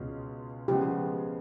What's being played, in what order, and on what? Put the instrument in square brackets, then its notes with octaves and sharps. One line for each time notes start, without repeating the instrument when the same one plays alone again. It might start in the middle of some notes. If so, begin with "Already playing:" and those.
Already playing: [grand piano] C#2 B2 G#3 C#4 F4
[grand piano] C#3 F3 G#3 B3 [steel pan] G4